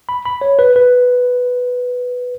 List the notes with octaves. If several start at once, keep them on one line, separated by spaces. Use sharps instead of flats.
B5
B5
C#5
B4
B4